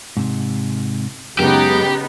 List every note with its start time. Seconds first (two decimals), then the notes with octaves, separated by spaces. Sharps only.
0.17 G#2 C3
1.39 F#2 C#3 G#3 B3 D#4 G4